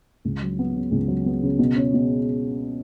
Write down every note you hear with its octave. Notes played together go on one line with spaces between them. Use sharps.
C#2
F#3
B3
C#3
C#2
F#3
B3
C#3
B2
C#4
B2